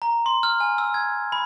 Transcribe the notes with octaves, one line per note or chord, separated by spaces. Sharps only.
A#5
C6
F6
G#5
E6
G#6
B5